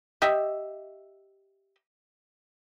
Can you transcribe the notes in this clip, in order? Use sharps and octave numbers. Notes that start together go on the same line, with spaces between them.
G4 D#5 E5